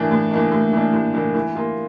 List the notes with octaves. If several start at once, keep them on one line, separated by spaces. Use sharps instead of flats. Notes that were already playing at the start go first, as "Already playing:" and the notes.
Already playing: A2 E3 A#3 D4
A2
E3 A#3 D4
A2
E3 A#3 D4
A2
E3 A#3 D4
E3
A#3 F4